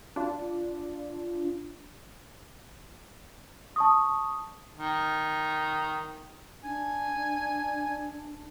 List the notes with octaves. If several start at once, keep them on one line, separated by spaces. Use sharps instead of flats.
D4 F4
A5 C#6 D#6
D#3
D4 G#5